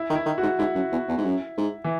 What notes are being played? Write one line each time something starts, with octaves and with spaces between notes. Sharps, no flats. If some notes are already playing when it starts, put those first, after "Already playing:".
Already playing: E4
D#3
E4
D#3
G#2 F#4
G#2 E4
F#2
E2
E2
G#2
F#2
G#2
E3